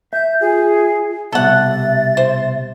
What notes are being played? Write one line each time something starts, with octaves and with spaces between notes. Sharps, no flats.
E5 G6
F4 G#4
C2 B2 G3 A4 E5 F#5 A6
C5